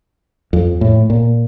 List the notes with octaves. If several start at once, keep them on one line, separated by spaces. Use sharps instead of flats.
F2
A2
A#2